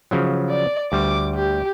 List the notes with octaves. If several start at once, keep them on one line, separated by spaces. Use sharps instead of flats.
C#3 F3 F#3
D5
D2 G3 D6
G4